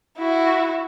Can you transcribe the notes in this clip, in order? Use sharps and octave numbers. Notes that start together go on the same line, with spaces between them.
E4 F#4